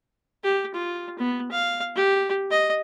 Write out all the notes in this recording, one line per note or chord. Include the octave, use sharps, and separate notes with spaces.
G4
F4
B3
F5
G4
D#5